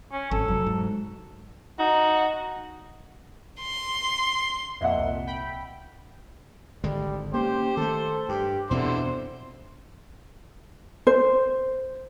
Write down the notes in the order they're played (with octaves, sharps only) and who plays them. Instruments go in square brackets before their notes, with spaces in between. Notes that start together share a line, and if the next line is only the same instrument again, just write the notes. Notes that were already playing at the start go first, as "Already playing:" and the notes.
[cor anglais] C#4
[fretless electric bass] G#1 [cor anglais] A4
[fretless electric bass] F1 [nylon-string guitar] F#3
[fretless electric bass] G#2
[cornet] D#4 [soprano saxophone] F#4
[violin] C6
[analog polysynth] F2 A#2 [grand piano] D#5 E5 F#5
[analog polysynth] C2
G5 B5
[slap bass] G#1 D3 G#3 [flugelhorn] G3
[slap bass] A#3 C#4 [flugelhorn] G4 [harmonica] C5
[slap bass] D#3 A3 [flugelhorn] A4
[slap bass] G2 [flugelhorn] G4
[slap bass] E2 B2 C4 [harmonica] D3 C5 [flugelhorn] E4
[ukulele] C5